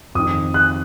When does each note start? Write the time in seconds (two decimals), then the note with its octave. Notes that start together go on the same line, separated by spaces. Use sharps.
0.15 F2 D#3 D#6
0.54 F#6